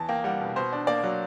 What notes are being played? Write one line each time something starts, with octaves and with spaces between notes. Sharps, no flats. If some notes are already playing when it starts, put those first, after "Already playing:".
Already playing: E2 A5
A#3 G5
G3 F#5
B2
B2 C5
D4
A#3 D5
F#3